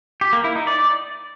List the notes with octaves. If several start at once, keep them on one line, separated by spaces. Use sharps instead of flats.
G4
A#3
E4
D#4
D5